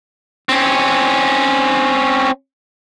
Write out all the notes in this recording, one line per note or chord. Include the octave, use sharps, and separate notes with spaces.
C4 C#4